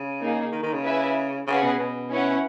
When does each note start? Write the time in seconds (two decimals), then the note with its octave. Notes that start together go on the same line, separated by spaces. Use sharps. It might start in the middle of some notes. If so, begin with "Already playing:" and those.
Already playing: C#3
0.21 A#3 D#4 G#4
0.52 D#3
0.63 D#3
0.73 C#3
0.84 E4 B4 E5 G#5
1.47 C#3 C#4 G#4 B4 F#5
1.63 B2
1.79 B2
2.10 C#4 E4 B4 F#5